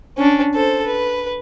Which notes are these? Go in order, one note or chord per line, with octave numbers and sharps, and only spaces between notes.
C#4 D4
A4 C5
B4